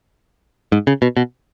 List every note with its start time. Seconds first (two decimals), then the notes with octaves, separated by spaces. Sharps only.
0.72 G#2
0.87 C#3
1.02 B2
1.17 B2